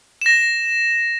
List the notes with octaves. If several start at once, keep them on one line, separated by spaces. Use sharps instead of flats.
A#6 E7